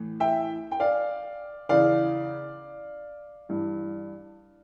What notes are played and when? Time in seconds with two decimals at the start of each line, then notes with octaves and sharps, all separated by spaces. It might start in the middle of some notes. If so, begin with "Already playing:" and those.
Already playing: A2 E3
0.20 E5 G5
0.71 G5
0.80 D5 F5
1.69 E2 C#3 E3 D5 F5
3.49 G2 E3